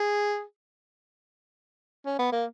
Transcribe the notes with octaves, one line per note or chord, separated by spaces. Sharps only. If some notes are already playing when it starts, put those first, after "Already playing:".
Already playing: G#4
C#4
B3
A#3